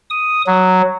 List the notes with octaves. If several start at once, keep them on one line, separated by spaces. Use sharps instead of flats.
D#6
F#3